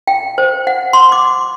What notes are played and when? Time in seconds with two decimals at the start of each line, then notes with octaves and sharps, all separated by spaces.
0.07 G5
0.38 C5
0.67 F#5
0.93 C6
1.12 D6